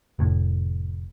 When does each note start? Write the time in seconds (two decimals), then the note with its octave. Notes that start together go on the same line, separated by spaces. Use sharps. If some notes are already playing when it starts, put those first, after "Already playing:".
0.19 F1 A2